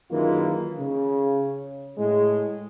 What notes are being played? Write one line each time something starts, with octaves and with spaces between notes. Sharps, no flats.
F#2 D#3 E3 G#3 A#3 F4
C#3
A2 G#3